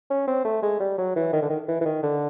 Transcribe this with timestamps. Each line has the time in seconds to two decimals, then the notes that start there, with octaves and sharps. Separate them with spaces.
0.11 C#4
0.28 C4
0.45 A3
0.63 G#3
0.80 G3
0.98 F#3
1.16 E3
1.33 D#3
1.42 D3
1.50 D#3
1.68 E3
1.81 E3
1.86 D#3
2.03 D3